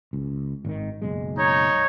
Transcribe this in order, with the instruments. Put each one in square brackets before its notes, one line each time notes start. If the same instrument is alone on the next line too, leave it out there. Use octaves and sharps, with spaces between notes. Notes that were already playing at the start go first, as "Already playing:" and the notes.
[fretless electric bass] C#2
G#1 C3 D#3
F#1 B1 G#3
[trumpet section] D#4 C#5